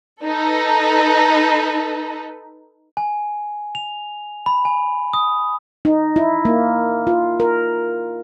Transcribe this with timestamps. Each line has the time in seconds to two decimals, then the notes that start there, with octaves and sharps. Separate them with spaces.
0.23 D#4 A4 B4
2.97 G#5
3.75 F7
4.46 B5
4.65 G#5
5.13 D#6
5.85 D#4
6.16 E4
6.45 A#3
7.07 F4
7.40 A#4